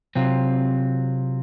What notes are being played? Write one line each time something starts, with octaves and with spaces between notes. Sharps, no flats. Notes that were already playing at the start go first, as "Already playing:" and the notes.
C3 F#3 C4 F4